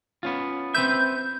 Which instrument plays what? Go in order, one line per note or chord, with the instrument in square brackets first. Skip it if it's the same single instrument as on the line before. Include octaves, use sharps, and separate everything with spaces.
[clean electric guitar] B3 C#4 F4
[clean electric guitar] C4 B4 E5 [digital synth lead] G6